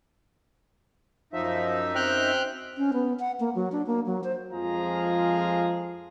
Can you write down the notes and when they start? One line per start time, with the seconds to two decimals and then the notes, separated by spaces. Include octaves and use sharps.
1.33 F#2 F3 D#4 E5
1.95 C4 G5 F6 F#6
2.77 C#4
2.93 B3
3.19 F#5
3.40 A#3
3.55 F#3
3.72 D4
3.87 A#3
4.06 F#3
4.24 C5
4.53 F2 F3 G#3 F4 G#4 A#5